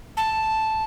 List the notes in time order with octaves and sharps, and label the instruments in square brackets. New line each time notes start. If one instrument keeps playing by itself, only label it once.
[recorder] A5